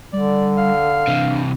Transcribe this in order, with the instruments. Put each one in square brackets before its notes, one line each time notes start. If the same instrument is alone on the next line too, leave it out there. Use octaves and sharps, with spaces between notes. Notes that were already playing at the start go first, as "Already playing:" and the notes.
[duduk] D3 [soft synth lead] G3 [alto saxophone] D5
[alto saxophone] F5
[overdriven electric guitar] C3 E3 [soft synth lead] D4